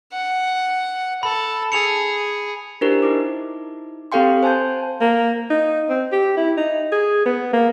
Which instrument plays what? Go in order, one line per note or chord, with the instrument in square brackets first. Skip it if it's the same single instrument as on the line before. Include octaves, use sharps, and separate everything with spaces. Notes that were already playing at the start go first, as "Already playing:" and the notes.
[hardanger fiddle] F#5
[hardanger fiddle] A4 [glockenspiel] B5
[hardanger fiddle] G#4 [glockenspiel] C#7 F7
[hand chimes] D4 E4 G4 A#4 C5
D#4 E4 D6
C4 G4 A4 F5 G5 C6
C5 G#5 A5 C6 G6
[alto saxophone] A#3
D#4
C4
G4
E4
D#4
G#4
B3
A#3